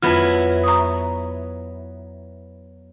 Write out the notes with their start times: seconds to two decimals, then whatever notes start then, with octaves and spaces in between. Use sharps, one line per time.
0.03 F2 F#3 B3 E4 F4
0.64 A#5 C#6 D#6